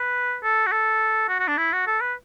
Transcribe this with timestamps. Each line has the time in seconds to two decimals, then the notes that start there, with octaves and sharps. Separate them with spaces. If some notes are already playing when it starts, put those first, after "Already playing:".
Already playing: B4
0.43 A4
0.67 F#4
0.72 A4
1.28 F#4
1.39 F#4
1.48 D4
1.57 E4
1.73 F#4
1.87 A4
2.01 B4